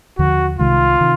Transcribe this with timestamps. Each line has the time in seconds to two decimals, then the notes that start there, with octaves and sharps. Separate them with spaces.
0.18 D#2 D3 F3 F#4
0.59 C2 C3 D#3 G#3 F4
1.01 C3 D#3